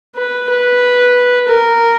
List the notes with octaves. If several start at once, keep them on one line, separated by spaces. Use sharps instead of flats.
B4
B4
A#4